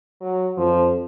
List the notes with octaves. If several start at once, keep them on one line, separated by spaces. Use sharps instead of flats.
F#3
F2 F3